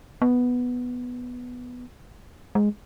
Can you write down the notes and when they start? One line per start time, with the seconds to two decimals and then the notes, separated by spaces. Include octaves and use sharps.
0.22 B3
2.55 G#3